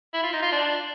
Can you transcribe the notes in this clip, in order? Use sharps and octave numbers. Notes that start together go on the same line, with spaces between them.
E4
F4
D#4
F4
D4